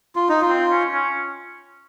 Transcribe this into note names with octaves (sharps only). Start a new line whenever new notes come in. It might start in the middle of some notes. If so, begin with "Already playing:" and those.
F4
D#4
F4
C4
C#4
C#4